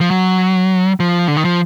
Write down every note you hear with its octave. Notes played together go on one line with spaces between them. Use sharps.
F3
F#3
F3
D3
D#3
F3